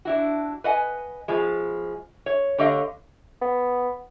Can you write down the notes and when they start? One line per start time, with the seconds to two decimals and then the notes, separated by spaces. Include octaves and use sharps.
0.05 D4 E4 F#4
0.64 B4 D#5 F#5 G#5
1.28 B2 F3 G#3
2.26 C#5
2.58 D3 A3 G4 C#5 D#5 F5
3.41 B3